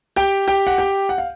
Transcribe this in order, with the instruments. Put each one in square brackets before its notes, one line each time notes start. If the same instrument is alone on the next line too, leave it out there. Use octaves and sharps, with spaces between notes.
[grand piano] G4 G5
G4 G5
F#5
G4 G5
F#5
F5